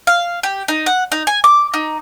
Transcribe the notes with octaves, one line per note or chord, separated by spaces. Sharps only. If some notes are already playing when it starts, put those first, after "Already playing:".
F5
G4
D#4
F#5
D#4
G#5
D6
D#4